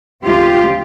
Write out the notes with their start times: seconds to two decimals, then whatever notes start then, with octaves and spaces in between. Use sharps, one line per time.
0.24 D2 C#3 F3 G#3 C4 F4 G4